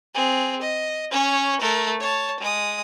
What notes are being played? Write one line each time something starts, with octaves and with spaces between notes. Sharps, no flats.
C4 G#4
D#5
C#4 C#5
A3 A#4
C#5 A5
G#3 D#6